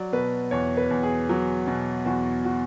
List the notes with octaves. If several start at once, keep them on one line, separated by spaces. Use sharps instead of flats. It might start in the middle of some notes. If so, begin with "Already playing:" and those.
Already playing: F#3 D5
B2 B4
E2 C#5
B4
E2
G#4
F#3
B2
E2 F#4
F#4